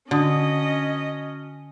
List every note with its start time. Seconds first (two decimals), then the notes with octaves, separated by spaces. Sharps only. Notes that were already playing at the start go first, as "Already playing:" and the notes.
0.11 D3 C#4 F#4 D#5 A5 D#6